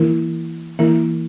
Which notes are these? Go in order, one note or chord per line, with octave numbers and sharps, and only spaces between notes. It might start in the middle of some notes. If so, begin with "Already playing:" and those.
Already playing: E3 A#3 E4 A#4
E3 A#3 E4 A#4